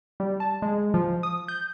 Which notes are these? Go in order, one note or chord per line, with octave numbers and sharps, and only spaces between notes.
G3
A5
G#3
F3
D#6
G6